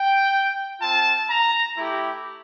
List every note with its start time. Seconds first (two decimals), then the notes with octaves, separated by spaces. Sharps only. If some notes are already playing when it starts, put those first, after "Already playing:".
Already playing: G5
0.80 C4 F4 A5
1.29 A#5
1.78 A3 E4 G4